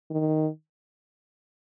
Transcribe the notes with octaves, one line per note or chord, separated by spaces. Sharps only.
D#3